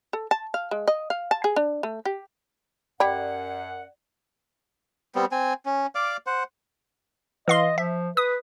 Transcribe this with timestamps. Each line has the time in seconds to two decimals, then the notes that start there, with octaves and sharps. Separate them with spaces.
0.13 A4
0.31 A5
0.54 F5
0.71 G#3
0.88 D#5
1.10 F5
1.31 A5
1.44 G#4
1.56 D4
1.83 A3
2.05 G4
3.00 F#2 G4 D5 F#5 G5 B5
5.15 G3 B3 C4
5.32 C4 G#5
5.66 C#4
5.95 D5 F5 D6
6.27 C5 F#5
7.48 E3 D#5 F5 C6
7.78 F3 E5
8.17 B4 D#6